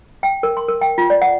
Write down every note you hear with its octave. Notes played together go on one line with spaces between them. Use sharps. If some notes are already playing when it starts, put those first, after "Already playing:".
G5
A#4
C6
A#4
G5
F4
D5
F#5